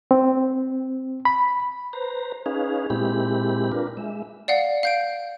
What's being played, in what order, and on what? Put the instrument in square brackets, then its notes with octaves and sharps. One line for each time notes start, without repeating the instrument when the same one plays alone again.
[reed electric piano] C4
B5
[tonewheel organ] B4 C5 A#5
C#4 D#4 G#4 B4 F5
A#2 G#3 C4 E4 G4 B5
D4 F4 A#4 B4
G#3 E5
[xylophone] D5 F5 F#5
F5 G6 D7